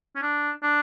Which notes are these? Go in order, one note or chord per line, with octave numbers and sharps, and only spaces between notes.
C#4
D4
D4